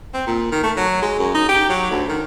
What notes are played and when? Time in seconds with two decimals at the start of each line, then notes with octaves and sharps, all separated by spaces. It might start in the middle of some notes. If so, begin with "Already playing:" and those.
0.14 C4
0.27 A#2
0.52 D#3
0.63 A3
0.77 F#3
1.02 G#3
1.19 F#2
1.35 D#4
1.49 G4
1.70 F#3
1.91 D2
2.09 D#3